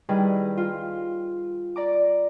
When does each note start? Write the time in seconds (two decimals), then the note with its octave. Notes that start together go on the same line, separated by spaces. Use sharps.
0.09 D#3 G3 E4 G#4 B4
0.57 F4
1.76 D5 A#5 D6